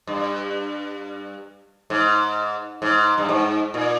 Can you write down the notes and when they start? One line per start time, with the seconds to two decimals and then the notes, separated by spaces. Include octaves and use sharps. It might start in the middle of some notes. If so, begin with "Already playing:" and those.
0.07 G2
1.90 G#2
2.82 G#2
3.18 G2
3.28 G#2
3.74 A#2